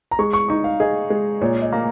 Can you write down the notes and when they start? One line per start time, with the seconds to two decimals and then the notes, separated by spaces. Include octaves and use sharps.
0.11 A#5
0.19 G#3 C#6
0.33 C#6
0.49 D#4 C#6
0.64 F5
0.80 G#4 D#5
1.10 G#3
1.41 A#2 C#5
1.62 D#5
1.72 A#3